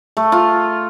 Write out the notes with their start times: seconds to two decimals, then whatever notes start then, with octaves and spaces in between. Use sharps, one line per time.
0.17 A3
0.32 F4